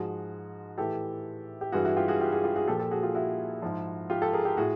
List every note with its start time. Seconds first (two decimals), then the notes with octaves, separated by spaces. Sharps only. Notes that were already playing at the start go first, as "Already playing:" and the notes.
Already playing: G#2 F3 F#4 G#4
0.78 A2 E3 G4 A4
1.61 G4
1.72 G2 E3 F#4 G#4
1.85 E4 F#4
1.97 F4 G4
2.08 F#4 G#4
2.20 F4 G4
2.32 F#4 G#4
2.44 F4 G4
2.56 F#4 G#4
2.68 A#2 F3 G4 A4
2.79 G4 A4
2.91 F#4 G#4
3.03 F4 G4
3.15 E4 F#4
3.62 G#2 F3
4.10 F4 G4
4.22 G4 A4
4.33 G#4 A#4
4.45 G4 A4
4.57 A2 F#4 G#4